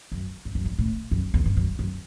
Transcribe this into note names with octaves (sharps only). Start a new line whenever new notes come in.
F#2
G2
F#2
G2
A2
F#2
E2
G2
F#2
F#2